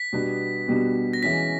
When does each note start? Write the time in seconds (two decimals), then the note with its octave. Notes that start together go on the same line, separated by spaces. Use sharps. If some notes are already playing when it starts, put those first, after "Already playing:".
Already playing: B6
0.13 B2 G3 B3 D4
0.68 B2 G3 B3 D4
1.13 A#6
1.23 E3 G#3 C#4 F#4 B6